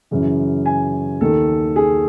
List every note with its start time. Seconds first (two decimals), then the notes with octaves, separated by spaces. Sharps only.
0.11 F#2 C#3 E3
0.66 G#5
1.21 D#2 D#3 A4
1.76 G#4